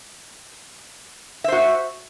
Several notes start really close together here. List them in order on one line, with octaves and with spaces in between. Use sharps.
E5 C5 F#4